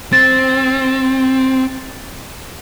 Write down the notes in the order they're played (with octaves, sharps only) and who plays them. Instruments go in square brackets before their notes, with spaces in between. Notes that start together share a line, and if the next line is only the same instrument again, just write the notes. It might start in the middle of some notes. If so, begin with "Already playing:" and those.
[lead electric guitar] C4 [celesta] A6